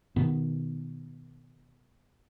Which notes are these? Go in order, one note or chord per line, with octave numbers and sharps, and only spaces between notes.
B2 D#3 B3